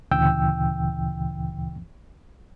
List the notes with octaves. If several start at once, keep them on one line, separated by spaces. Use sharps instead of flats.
D2 A#2 C#3 E3 G5 E6